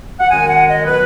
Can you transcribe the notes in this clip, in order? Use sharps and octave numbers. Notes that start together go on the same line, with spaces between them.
F#5
F#2 D#3 G#3 G#5
F#5
D#5
B2 F#3 B4